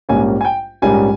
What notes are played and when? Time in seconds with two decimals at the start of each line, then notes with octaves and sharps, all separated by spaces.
0.09 A#1 G#2 G3 A#3 C#4 G#5
0.41 G#5
0.45 G5
0.82 A#1 G#2 G3 A#3 C#4 G#5